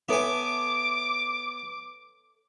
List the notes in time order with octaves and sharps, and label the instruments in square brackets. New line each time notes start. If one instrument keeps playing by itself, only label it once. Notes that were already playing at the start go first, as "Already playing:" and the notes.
[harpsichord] B3 G#5 [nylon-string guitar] A4 C#5 E5 [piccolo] D6